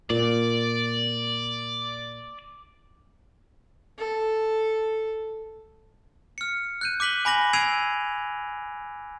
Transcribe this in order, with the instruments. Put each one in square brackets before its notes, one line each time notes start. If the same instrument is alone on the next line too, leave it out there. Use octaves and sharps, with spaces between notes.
[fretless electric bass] A#2 [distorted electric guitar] D5
[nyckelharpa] A4
[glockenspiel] F6 C#7
F#6 G6 D#7
D6 F#6 B6 F#7 G7
G#5 B5 D6 A#6 F#7
E6 G#6 C7 D7 D#7 F7